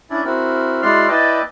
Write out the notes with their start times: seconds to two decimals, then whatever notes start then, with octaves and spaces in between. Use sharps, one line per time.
0.10 C#4 D4 E4 D5
0.25 C4 E4 F#4 A#4
0.82 G#3 E4 F#4 D5 C6 F6
1.08 E4 B4 D5 D#5 G5 A5